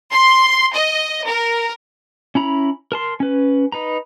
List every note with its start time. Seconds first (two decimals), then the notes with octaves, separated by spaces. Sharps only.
0.13 C6
0.73 D#5
1.26 A#4
2.35 C#4 E4 A#5 B5
2.92 A#4 A5 C6
3.20 C#4 B4
3.72 D#4 B4 A#5